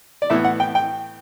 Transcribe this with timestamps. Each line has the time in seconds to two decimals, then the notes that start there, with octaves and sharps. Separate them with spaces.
0.22 D5
0.30 A2 E3 B3 E5
0.45 F#5
0.60 G5
0.75 G5